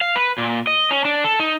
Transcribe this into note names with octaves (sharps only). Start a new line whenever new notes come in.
F5
B4
A#2
D#5
C#4
D4
A4
D#4